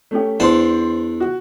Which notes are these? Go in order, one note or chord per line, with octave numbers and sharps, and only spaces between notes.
A3 C#4 G4
E2 D4 C5 A5 C6
F#4